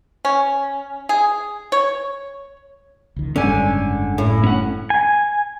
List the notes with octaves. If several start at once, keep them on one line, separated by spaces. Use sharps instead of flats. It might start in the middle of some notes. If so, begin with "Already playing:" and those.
C#4
G#4
C#5
C#2 D#3
F#1 G#2 D3 G3 C#4 G#5
A2
C#4 F#5
G#5